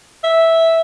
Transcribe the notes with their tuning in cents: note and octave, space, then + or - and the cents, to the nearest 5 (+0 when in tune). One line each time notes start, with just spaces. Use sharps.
E5 -10